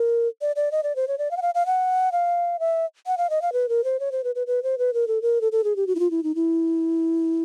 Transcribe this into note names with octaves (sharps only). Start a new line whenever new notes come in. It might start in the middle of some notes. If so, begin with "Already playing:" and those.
Already playing: A#4
D5
D5
D#5
D5
C5
C#5
D5
F5
F#5
F5
F5
F#5
F5
E5
F#5
F5
D#5
F5
B4
A#4
C5
C#5
C5
B4
B4
B4
C5
B4
A#4
A4
A#4
A4
A4
G#4
G4
F#4
E4
F4
E4
D#4
E4